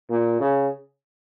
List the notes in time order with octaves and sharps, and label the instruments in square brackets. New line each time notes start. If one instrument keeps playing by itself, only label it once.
[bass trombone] A#2
C#3